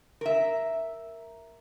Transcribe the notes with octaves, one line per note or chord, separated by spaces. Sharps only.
A#4 E5